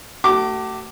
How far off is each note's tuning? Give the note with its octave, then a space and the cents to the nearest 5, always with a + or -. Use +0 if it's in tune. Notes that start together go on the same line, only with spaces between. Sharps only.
A3 +25 F#4 +45 D6 +0